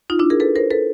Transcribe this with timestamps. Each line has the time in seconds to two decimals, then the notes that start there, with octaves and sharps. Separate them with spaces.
0.10 D#4 F4
0.19 D4 E4
0.30 G#4 A#4
0.40 A4 B4
0.56 A#4 C5
0.71 A4 B4